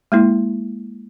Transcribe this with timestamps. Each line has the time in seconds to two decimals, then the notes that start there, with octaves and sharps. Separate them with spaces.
0.12 G#3 A#3 E4